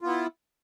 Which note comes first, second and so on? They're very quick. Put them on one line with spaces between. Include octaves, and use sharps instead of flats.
F4 B3 E4